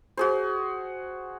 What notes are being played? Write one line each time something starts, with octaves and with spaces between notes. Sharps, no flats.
F#4 G#4 C5